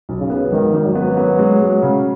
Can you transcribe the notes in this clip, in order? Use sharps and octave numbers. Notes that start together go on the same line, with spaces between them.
B1
C#3
B3
G#1 D#3
G#1
F#3
B3
B3
G#3
G#3
C#3